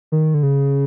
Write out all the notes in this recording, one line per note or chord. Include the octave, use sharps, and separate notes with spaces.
D#3
D3
C#3